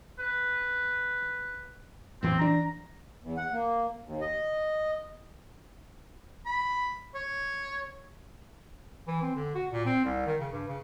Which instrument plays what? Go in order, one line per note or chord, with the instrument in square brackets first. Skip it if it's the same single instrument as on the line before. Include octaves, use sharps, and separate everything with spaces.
[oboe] B4
[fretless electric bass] A1 F2 E3 [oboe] C4
[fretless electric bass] E3 D4 [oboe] A#5
[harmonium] E2
F#5
A#3
D#2
D#5
[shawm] B5
C#5
[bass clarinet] E3
C4
D3
F#4
A#2
C4
C2
D#3
C#3
G2
C#3